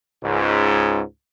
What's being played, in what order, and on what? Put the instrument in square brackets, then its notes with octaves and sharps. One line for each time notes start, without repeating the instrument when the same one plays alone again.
[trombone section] C#2 G#2